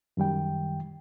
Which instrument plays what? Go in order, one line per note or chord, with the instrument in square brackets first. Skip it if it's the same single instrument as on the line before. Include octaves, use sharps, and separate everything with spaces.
[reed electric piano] F#2 D#3 G3 G5